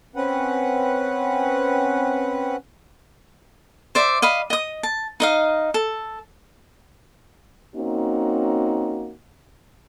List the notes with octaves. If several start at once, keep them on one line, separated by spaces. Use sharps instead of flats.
C4 C#4 B4 F#5
C5 D5 E5
D#5 F5 B5
D#5 D#6
A5
D#4 D#5 F5
A4
A#3 C4 C#4 D#4 F#4